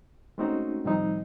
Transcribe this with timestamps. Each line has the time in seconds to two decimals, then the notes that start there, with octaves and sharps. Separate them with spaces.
0.38 G#3 A3 C4 C#4 D#4 F#4
0.85 A2 D#3 F3 G3 C4 D#4